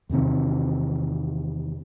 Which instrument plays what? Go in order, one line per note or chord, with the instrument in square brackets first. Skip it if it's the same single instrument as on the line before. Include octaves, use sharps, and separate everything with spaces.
[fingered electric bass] E2 C3 D#3 C4